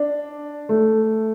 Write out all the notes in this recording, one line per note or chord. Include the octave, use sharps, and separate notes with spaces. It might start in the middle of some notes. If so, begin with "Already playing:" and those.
Already playing: D4
A3